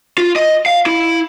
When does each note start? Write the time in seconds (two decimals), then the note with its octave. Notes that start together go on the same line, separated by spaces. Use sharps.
0.18 F4
0.36 D#5
0.66 F5
0.86 E4